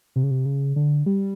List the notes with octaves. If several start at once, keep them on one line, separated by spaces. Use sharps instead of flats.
C3
C#3
C3
C#3
D3
G3